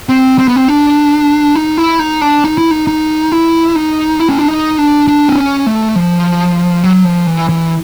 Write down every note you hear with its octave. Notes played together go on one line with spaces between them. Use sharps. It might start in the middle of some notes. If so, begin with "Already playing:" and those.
C4
C4
B3
C4
D4
D#4
E4
D#4
D4
D#4
E4
D#4
D#4
E4
D#4
E4
C#4
D4
D#4
D4
D4
C4
C#4
A3
F3
F#3
F3
E3
E3